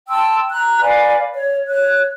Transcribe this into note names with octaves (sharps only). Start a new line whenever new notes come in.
G5 A5 C6 E6
A#5 F#6
B4 D5 F5 G#5
C#5
C#5 F#6